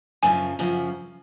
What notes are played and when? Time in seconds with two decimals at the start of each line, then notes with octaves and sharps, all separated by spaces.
0.23 F#2 C#3 F3 G#5
0.59 F#2 C#3 F3